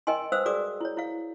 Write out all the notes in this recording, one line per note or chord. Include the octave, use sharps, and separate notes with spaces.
A#4 D#5 G5 G#5 C6
B4 C5 F5 D#6 E6
F#4 G#4 A#4 D5 D6 D#6
E4 C#5
E4 F5